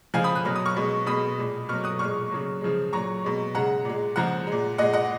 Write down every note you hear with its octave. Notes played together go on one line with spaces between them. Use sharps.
C#3 F3 G#3 F5 G#5
B5 D#6
F#6
B2 F#3 F6
D#6
C#6 F6
B2 G#3
B2 G#3 B5 D#6
A#2 G#3
B2 F#3 C#6 F6
D#6 F#6
A#2 G#3 C#6 F6
C#3 F#3
C#3 F3 G#3
A#2 F#3 A#5 C#6
B2 G#3
C#3 G#3 F#5 A#5
A#2 G#3
C#3 F3 G#3 F#5 A#5
A#2 G#3
A#2 G#3 D#5 F#5
D#5 F#5